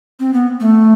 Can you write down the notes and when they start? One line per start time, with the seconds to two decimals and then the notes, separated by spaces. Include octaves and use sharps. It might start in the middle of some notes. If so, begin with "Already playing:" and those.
0.20 C4
0.33 B3
0.60 A3